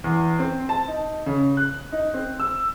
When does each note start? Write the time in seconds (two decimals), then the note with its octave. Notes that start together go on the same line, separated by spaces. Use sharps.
0.04 E2
0.39 C4
0.69 A5
0.88 D#4
1.26 C#3
1.57 F#6
1.92 D#4
2.14 C4
2.40 E6